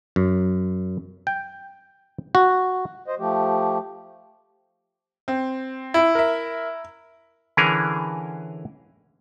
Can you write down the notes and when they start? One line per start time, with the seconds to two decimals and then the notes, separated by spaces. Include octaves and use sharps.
0.16 F#2
1.27 G5
2.35 F#4
3.06 C5 D#5
3.19 F3 A3 G4
5.28 C4
5.94 E4
6.15 A#4 E5
7.57 D3 E3 C#4 G#4 A#4